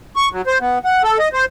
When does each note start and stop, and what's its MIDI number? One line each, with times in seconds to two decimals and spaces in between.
0.16 0.29 85
0.32 0.42 54
0.47 0.58 72
0.60 0.79 59
0.85 1.02 78
1.03 1.18 69
1.19 1.29 75
1.33 1.45 72